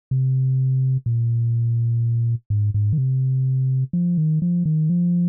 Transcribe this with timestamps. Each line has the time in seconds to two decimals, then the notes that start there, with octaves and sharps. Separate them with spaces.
0.11 C3
1.06 A#2
2.50 G#2
2.74 G#2
2.93 D#3
2.98 C3
3.93 F3
4.18 D#3
4.42 F3
4.65 D#3
4.90 F3